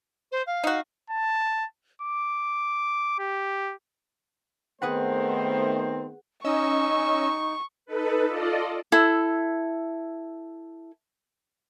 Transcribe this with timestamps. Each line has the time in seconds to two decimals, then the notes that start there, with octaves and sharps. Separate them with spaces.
0.31 C5
0.46 F5
0.64 D#4 F#4
1.10 A5
2.02 D6
3.19 G4
4.82 D#3 A3 B3 C4 G#4 B4 C5 F#5
6.44 C#4 D#4 D#5 C#6 E6
7.86 D#4 A4 B4
8.26 F4 A4 D5 D#5
8.92 E4 A4